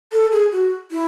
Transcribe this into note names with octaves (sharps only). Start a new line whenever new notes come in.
A4
G#4
F#4
E4